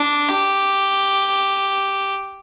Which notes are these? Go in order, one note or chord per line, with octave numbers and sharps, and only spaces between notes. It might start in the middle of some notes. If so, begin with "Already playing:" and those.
Already playing: D4
G4